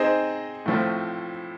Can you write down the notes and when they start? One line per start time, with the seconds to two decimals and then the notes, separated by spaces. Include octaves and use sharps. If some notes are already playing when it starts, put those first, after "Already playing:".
Already playing: C4 D#4 G#4 C5 D#5
0.66 A2 F3 A3 C4 F4